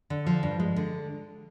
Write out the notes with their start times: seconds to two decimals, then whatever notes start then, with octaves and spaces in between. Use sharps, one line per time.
0.10 D3
0.26 F3
0.43 G2
0.60 G#3
0.76 D3